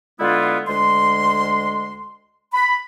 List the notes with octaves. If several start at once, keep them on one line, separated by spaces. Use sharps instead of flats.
D3 G#3 B3 E4 F4
D2 G#3 C6
B5